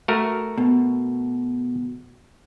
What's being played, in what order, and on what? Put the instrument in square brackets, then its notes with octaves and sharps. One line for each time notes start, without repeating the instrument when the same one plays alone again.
[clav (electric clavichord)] A3 F#4 A#4
[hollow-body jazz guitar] B2